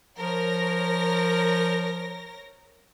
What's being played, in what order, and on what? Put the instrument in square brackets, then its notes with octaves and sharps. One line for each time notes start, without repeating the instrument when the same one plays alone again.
[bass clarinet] F3 [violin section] A#4 C#5 A#6